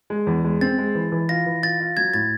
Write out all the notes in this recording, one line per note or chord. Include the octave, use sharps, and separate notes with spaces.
G#3
E2
G#3
C4 A6
G#3
E3
E3
F4 A#6
E3
F4 A6
F4
F#3 G#6
A2 A6